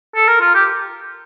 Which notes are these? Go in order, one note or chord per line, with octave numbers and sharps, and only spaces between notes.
A4
A#4
F4
G4